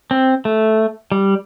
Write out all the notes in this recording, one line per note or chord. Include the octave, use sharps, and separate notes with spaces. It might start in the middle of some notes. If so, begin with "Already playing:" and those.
C4
A3
G3